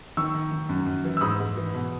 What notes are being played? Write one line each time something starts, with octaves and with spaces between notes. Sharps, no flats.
D#3 C#6 E6
D#3
D#3
F#2
F#2
E3
E6
G#2 B5 D#6
G#2
E3
B2